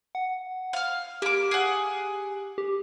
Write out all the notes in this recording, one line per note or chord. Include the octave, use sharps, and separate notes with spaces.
F#5
F5 F6
A#3 G4 D6
G#4 F#5
G4